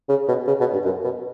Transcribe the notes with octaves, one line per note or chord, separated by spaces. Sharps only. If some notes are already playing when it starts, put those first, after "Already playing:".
C#3
B2
C#3
B2
G2
F#2
B2